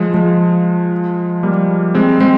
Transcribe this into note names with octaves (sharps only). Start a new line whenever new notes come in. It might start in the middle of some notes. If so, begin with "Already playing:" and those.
Already playing: F3 G#3
F3 G#3
G3 A#3
G#3 C4
G#3 C4